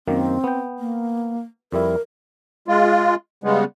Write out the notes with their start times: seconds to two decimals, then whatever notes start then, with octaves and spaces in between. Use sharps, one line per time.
0.08 F#2 D#3 A#3 C4
0.44 B3 G5
0.79 A#3
1.72 F2 G3 E4 A#4
2.68 G#3 F4
3.44 C#3 G3 G#3 B3